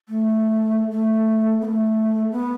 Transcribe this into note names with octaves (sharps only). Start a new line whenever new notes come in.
A3
A3
B3
A3
B3